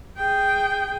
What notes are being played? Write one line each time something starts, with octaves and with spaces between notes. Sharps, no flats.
G#4 G5